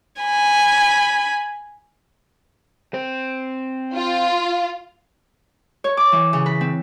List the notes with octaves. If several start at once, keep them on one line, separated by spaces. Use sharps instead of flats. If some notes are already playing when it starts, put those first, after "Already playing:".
G#5 B5
C4
F4
C#5
D6
E3
C#3
B4
C4